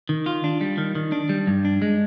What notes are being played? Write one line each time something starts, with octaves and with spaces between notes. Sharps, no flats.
D#3
F4
D4
G3
D#3
D#3
D4
G3
G2
D4
G#3